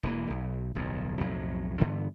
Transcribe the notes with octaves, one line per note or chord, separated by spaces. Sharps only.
E1 E3 A#3
B1
D1 B1 F2
B1 F2 A2 F#3
G2 D3 E3 B3